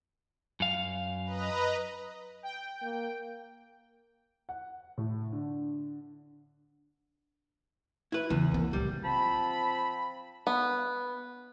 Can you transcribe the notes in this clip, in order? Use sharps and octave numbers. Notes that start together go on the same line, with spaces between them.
F#2 F5
B4 D#5 A#5
G5
A#3
F#5
A2
D3
E4 B4
E2 C#3 F3
C2 A#3
C#2 A2 G3
F3 C4 A5 B5
B3